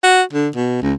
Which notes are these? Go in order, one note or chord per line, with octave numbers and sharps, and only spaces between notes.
F#4
D3
B2
C#2